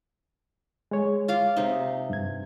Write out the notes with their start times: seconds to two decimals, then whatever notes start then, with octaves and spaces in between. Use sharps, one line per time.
0.91 G#3 C#5
1.28 F4 F5 D6
1.57 C3 D#4
2.10 G2 G#6